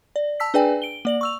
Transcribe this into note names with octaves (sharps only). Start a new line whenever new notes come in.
D5
A5 E6 B6
D4 G#4 B4 D5 G5 G#5
D7 G7
A#3 D5 F#7
C#6 E6 F7